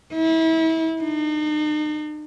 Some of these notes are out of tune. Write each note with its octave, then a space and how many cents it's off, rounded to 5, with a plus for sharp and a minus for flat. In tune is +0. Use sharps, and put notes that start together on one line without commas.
E4 -30
D#4 -45